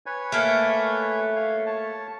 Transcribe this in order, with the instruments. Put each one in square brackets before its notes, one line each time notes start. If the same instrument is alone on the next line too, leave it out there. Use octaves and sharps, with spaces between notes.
[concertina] B4 C#5 G#5
[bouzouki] A3 A#3
[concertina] C#5 F5
C#5 A5